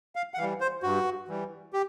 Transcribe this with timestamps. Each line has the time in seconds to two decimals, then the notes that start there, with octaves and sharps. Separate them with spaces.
0.16 F5
0.34 F#5
0.38 E3 G3 F5
0.61 C5
0.83 G2 F#4
1.28 E3 G3
1.73 G4